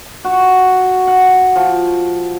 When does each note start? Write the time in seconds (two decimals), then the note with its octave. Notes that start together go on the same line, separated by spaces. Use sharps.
0.24 F#4
1.07 F#5
1.56 F3